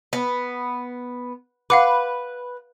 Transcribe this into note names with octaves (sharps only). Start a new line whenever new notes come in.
B3
B4 F5 F#5 D6